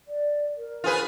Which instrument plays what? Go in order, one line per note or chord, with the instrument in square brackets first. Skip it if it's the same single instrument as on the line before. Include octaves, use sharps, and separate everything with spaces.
[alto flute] D5
A#4
[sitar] F4 G#4 B4